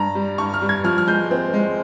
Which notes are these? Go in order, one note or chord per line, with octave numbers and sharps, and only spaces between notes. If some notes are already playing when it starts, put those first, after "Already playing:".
Already playing: G2 A#5
G3
G2 C#6
F6
G3
G#6
F3 F6
F6
G#3 G6
C4
G#3